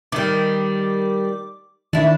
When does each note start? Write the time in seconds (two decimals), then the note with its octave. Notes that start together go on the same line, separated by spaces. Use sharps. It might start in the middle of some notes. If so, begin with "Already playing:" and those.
0.12 D#3 G3 D6
1.93 D#3 D4 E4